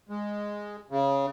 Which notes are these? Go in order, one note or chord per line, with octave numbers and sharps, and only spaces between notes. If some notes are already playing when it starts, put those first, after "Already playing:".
G#3
C#3